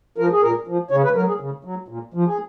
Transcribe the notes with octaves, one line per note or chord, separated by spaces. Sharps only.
F3 A#4
G#4
A#2 A#4
F3
C#3 C#5
B4
F#3 A#4
G#4
C#3
F#3
A#2
F3
G#4